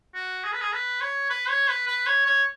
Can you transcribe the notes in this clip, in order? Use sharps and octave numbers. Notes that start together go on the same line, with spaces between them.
F#4
G#4
B4
G#4
B4
C#5
B4
C#5
B4
B4
C#5
C#5